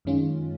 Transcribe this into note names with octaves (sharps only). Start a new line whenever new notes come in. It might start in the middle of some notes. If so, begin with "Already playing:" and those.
F#2 D#3 G#3 C#4 F4